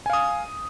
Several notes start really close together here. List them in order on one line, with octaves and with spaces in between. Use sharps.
G#5 F5 D#6